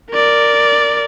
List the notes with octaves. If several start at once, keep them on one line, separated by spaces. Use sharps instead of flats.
A#4 D5